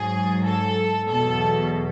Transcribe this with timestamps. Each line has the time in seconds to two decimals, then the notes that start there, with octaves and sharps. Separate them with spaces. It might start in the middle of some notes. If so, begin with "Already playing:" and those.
Already playing: G#2 F#3 G#4
0.45 A4
1.08 E2 B2 F#3 A4